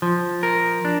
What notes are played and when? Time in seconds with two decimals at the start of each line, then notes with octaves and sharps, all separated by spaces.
0.02 F3
0.43 A#4
0.85 D4